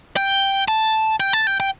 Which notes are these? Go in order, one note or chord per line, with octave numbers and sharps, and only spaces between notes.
G5
A5
G5
A5
G5
G5